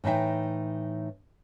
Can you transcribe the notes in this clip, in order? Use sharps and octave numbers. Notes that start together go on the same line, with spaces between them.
A2 E3 D#4 E5 G5